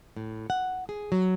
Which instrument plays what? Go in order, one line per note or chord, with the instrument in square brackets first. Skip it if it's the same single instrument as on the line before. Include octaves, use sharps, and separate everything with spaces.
[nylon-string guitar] A2
F#5
G#4
F#3